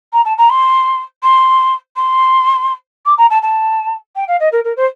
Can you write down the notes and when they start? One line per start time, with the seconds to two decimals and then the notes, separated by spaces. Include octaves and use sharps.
0.13 A#5
0.25 A5
0.38 A#5
0.50 C6
1.23 C6
1.96 C6
3.06 D6
3.18 A#5
3.30 A5
3.43 A5
4.16 G5
4.28 F5
4.40 D#5
4.52 A#4
4.64 A#4
4.77 C5